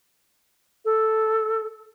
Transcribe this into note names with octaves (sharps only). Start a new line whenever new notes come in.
A4